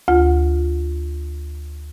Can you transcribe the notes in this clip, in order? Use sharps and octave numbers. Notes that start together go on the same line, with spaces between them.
D2 F4